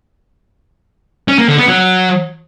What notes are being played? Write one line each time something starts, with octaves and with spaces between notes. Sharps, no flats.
C#4
A#3
D3
B3
F#3